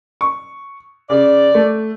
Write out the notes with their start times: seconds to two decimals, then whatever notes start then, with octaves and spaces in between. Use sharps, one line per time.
0.21 C#6
1.10 C#3 D5
1.55 A3